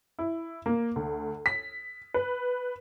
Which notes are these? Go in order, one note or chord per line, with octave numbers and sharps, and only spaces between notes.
E4
A#3
D2
B6
B4